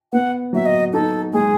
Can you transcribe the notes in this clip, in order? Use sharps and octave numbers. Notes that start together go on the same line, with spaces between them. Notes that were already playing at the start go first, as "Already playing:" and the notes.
B3 F#5
F#3 E5
D#5
D#4 A4
G#3 G#4